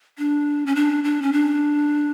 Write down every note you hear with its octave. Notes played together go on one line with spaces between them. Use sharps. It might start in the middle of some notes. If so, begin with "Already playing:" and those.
D4
C#4
D4
D4
C#4
D4